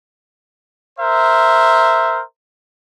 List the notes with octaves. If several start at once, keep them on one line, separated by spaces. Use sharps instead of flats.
A#4 C5 E5